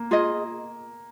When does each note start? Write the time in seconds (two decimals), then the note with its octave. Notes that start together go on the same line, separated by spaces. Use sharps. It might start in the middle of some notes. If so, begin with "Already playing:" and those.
Already playing: A#3
0.11 F4 G#4 D#5